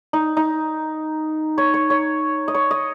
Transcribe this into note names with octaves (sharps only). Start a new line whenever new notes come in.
D#4
D#4
C#5
C#5
C#5
D#5
C#5
D#5